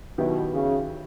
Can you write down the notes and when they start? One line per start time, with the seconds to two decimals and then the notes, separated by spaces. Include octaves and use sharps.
0.18 B2 D#3 F#3 B3 E4 G4
0.53 C#3